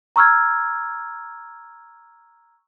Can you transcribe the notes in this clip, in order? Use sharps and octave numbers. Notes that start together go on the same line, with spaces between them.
A#5 C#6 E6 F6 G#6